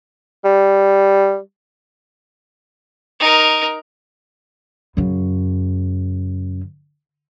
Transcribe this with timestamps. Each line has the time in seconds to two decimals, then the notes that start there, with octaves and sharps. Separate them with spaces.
0.44 G3
3.20 D#4 A#4
4.97 F#2 C#3